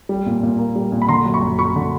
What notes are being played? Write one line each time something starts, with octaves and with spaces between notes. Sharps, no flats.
G3
A#2
A#2
A#3
G3
A#2
B5
D3 A#5 C6
F#2
B5 C#6
F#2
F#3 B5 C#6
D3